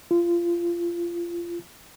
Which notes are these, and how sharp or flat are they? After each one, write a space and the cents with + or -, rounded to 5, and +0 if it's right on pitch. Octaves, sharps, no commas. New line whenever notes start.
F4 -25